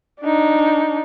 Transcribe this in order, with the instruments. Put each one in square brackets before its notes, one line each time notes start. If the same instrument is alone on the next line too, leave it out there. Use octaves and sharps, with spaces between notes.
[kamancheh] D4 D#4